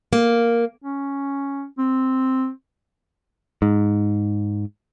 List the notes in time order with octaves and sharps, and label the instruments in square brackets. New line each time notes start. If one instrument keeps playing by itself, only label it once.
[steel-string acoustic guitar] A#3
[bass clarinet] C#4
C4
[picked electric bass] G#2